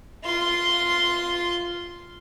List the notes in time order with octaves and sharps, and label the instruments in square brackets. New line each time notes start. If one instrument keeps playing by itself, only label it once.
[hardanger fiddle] F4 C6